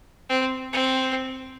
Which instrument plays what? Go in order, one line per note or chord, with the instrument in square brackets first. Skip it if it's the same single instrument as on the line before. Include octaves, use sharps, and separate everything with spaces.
[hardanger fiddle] C4
C4